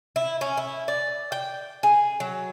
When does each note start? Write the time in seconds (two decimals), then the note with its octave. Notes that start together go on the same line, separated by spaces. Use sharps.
0.16 E4
0.41 C#4
0.57 E4
0.88 D5
1.32 G5
1.83 G#4
2.20 F#3